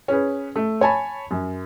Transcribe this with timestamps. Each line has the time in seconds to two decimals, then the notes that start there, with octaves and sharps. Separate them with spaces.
0.08 C#4 G#4 B4
0.56 A3
0.81 C#5 G#5 A5 B5
1.31 F#2